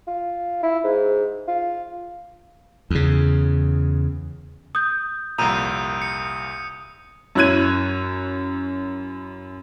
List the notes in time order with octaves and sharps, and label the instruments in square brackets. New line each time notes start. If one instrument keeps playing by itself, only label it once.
[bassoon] F4
E4
G#2
F4
[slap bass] E2 C#3
[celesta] D#6 G6
[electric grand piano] C2 F2 A#2 [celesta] A#5 [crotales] D#6 G6 D#7
[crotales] C#7
[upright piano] F#2 E4 C#5 F#6 G#6 D#7